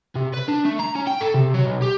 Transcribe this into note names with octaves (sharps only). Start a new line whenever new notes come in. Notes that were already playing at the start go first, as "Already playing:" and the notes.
C3
B4
D4
A3
A#5
C#4
G5
A4
C3
F#3
B1
G4